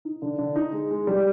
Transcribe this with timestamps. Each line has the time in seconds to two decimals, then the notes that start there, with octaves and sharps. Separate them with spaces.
0.05 D#4
0.22 D3
0.38 D3
0.56 D#4
0.73 G#3
0.91 G#3
1.07 G3